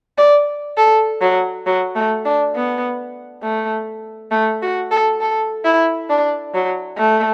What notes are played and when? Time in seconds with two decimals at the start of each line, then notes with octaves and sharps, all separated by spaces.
0.18 D5
0.77 A4
1.21 F#3
1.66 F#3
1.96 A3
2.25 D4
2.55 B3
3.43 A3
4.31 A3
4.62 F#4
4.91 A4
5.21 A4
5.65 E4
6.09 D4
6.54 F#3
6.98 A3